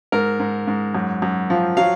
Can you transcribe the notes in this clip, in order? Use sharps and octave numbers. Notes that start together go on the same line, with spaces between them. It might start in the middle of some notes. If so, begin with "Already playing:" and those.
G#2 A#4
G#2
G#2
F#2
F#2
F3
F#3 F5